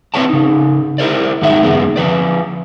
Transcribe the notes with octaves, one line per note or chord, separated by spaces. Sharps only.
C4 B4 C#5 D5 A5
C#3 D#4
E4 A#4 C5 D5
G#2 D#3 F#3 D#4 E5
F#2 C#3 G#3 A#3 B3
F3 B4 D5